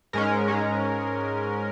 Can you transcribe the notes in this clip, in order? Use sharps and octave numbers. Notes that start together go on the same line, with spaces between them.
G#2 G#3 C#4 A#4
G#2 G#3 C#4